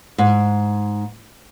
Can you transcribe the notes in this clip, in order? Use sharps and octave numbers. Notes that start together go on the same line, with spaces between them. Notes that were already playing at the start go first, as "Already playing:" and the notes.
G#2